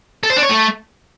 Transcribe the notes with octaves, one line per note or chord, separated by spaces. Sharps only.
A4
C5
D4
C#5
A3